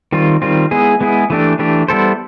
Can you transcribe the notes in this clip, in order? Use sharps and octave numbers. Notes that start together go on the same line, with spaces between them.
D#3 G3 C4 F4
D#3 G3 C4 F4
G#3 B3 E4 G#4
G#3 B3 E4 G#4
E3 A3 D4 G4
E3 A3 D4 G4
G3 B3 E4 A4 C5